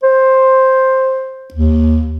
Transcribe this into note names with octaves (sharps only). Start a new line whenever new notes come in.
C5
D#2